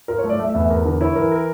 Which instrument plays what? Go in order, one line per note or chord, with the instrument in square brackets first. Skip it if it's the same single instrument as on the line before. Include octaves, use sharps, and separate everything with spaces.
[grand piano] F4 [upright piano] A#4
[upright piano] C#5
[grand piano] A3
[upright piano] D5
[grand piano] A3 [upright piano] E5
[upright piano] E5
[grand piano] E2
[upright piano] E5
[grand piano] E2 [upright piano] A#4
[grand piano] D3 [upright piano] A#4
[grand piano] E4 [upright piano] C#5
[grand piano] E3 [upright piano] A#4
[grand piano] A#4